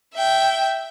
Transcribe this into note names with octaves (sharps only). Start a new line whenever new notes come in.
E5 G5